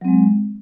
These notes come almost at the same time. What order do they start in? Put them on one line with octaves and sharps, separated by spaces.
F#3 C4 G#3